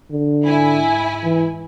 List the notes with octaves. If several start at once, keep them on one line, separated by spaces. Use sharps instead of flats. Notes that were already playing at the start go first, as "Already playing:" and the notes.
D3
G#2 E4 G#5
E3